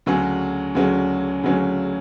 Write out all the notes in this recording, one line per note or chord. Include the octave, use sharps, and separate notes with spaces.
D2 C#3 F#3 C#4 G#4
D2 C#3 F#3 C#4 G#4
D2 C#3 F#3 C#4 G#4